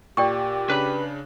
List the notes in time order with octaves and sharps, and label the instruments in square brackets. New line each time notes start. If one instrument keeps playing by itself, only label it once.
[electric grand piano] A#2 [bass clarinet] G4 [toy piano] D5 G5 C#6
[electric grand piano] C#3 D4 [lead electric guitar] B4 B5